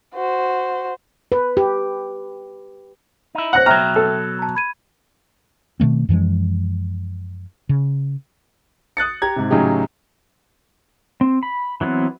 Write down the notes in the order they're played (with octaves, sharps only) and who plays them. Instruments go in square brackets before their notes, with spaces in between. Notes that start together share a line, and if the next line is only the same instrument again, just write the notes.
[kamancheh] F#4 C5
[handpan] B4
G4
[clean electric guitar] D#4 E4
[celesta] C5 A#6 F#7 [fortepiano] F#5 F#6
[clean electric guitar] B2 F#3 [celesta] E5 G5 F6 [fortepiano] A#5
[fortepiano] A4
[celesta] A5 A#5
B5 G#6 D#7
[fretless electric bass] B2 D#3 A3 C4
F#2 E3 F3 G#3
C#3
[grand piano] D#6 F#6 A6 C#7
G4 A#5 G#6
G#2 C3
A2 C#3 F#3 D#4 G4
[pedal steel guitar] C4
B5
E3 F#3 B3 C4